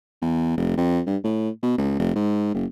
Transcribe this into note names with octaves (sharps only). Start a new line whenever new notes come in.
E2
F1
F2
G2
A2
B2
C#2
F1
G#2
F#1